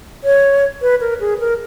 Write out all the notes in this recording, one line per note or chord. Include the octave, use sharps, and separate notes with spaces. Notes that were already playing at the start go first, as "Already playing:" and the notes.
C#5
B4
A#4
G#4
A#4